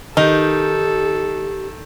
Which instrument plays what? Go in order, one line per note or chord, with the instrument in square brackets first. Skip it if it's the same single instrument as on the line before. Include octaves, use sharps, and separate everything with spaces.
[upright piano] D#3 [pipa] D#4 [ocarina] G4 [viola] A4